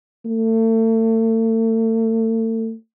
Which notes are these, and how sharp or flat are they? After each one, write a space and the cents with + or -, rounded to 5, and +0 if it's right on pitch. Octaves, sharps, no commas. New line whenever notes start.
A3 +35